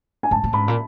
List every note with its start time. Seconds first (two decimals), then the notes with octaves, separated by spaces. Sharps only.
0.23 G#5
0.31 G#2 A5
0.44 A2
0.53 G#2 B5
0.68 A#2